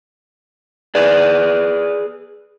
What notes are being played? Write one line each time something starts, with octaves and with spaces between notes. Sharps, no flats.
G#4 B4 D5